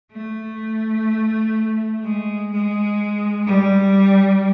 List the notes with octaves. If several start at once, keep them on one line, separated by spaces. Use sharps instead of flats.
A3
G#3
G#3
G3